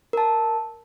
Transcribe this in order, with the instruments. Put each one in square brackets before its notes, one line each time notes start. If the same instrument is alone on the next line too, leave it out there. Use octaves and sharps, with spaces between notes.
[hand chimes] A#4 A5